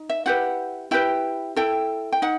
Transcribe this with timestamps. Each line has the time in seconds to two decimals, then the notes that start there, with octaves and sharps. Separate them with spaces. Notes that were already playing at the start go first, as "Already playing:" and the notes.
Already playing: D#4
0.10 E5
0.26 E4 G4 B4 F#5
0.91 E4 G4 B4 G5
1.56 E4 A4 G5
2.13 G5
2.22 D#4 F#5